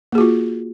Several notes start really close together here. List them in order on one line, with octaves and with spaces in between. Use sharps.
A#3 G#4 F#4 F4